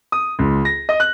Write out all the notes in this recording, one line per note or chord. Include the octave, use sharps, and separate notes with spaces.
D#6
C#2
A#6
D#5
F#6